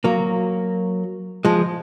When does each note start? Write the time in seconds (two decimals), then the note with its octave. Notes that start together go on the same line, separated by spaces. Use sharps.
0.04 F#3 A#3
1.45 F3 G#3